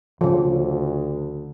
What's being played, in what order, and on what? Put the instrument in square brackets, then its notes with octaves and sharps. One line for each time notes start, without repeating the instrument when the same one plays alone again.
[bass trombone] D2 [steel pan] C#3 F3